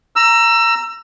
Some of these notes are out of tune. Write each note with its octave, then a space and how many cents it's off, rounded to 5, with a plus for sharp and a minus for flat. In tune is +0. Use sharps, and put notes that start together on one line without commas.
A#5 +0 E6 +25